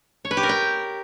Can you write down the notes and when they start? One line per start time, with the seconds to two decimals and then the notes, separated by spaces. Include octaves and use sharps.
0.25 C#5
0.31 B4
0.37 G4
0.43 A#4
0.49 G5